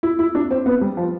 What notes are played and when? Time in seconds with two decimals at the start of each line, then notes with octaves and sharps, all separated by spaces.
0.03 E4
0.19 E4
0.35 D4
0.51 C4
0.66 B3
0.81 G3
0.97 F3